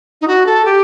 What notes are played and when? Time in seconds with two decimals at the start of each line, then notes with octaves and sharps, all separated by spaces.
0.21 D#4
0.28 F#4
0.46 A4
0.65 G4